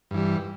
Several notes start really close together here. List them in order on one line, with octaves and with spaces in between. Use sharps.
G2 E3 G3